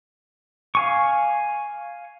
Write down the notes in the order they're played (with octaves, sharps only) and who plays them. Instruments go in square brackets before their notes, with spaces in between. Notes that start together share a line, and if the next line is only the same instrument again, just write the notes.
[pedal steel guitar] F5 G#5 C#6